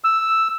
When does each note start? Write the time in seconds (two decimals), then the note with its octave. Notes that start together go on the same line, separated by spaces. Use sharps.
0.04 E6